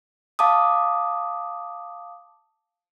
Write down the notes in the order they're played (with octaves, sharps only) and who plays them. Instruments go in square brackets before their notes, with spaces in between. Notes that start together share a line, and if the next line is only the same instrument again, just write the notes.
[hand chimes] F5 A5 D6 D#6